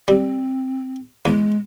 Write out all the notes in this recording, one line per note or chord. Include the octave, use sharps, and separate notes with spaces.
G3 C4
E2 G#3